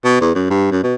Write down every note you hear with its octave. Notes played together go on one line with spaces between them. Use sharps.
B2
E2
F#2
G2
F#2
B2